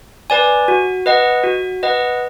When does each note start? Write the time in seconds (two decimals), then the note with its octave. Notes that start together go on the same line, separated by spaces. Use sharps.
0.30 B4 D5 G#5
0.68 F#4
1.06 B4 D#5 F#5
1.44 F#4
1.83 B4 D#5 F#5